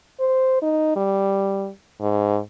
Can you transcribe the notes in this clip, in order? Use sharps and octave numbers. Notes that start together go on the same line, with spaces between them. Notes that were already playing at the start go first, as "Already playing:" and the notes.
C5
D#4
G3
G#2